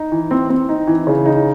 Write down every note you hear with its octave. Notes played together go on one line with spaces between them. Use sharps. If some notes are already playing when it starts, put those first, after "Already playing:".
Already playing: D#4
E3
C4
C4
D#4
E3
C#3
D#4